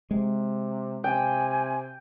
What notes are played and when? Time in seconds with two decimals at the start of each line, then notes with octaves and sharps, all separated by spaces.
0.11 C3 G#3
1.04 C3 G5 G#5